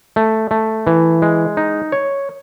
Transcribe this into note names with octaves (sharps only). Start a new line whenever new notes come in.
A3
A3
E3
G#3
D#4
C#5